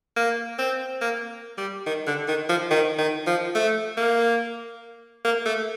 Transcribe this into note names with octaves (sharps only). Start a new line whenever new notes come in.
A#3
C4
A#3
G3
D#3
D3
D#3
F3
D#3
D#3
F3
A3
A#3
A#3
A3